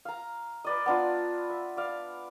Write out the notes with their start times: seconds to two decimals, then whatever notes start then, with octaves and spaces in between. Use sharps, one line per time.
0.05 F5 A#5
0.65 B4 D5 D#5
0.86 B3 D4 F4
1.50 E5
1.77 D5 F5